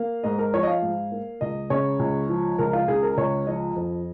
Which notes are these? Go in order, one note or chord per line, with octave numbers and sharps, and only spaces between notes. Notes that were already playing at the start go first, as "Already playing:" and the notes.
Already playing: A#3 F5
G#2 D#5
A#4
F3 C#5
D#5
F5
G#2
A#3
C#2 D#5
C#3 C#5
C#2
F3
C#2 A#4
F4
C#3 G#4
A#4
C#2 C#5
F3 D#5
F2